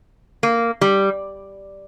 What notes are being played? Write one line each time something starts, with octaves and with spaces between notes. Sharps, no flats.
A#3
G3